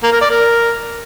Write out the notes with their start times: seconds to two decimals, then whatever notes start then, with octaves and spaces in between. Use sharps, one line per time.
0.03 A#3
0.12 A#4
0.21 D5
0.31 A#4